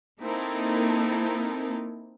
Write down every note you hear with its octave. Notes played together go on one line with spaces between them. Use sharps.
A#3 C4 D#4 E4 A4 A#4